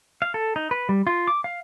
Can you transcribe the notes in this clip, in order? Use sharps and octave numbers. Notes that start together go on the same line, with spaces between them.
F5
A4
D#4
B4
G3
F4
D6
F5